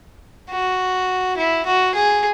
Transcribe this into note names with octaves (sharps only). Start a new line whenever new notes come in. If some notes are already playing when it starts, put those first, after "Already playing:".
F#4
E4
F#4
G#4